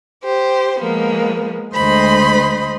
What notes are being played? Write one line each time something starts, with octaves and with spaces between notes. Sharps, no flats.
G4 C5
F3 G#3 A#3 B3
D2 G#3 C5 D#5 B5 C6